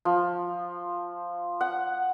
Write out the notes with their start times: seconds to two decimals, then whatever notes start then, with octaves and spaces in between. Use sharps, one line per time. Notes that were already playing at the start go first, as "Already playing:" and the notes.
0.05 F3
1.61 F#5